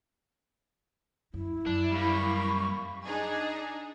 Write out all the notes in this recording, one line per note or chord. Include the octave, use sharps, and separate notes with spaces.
F#2 E4
F#2 D4
G3 A#3 B5 C#6
D4 D#4 G#4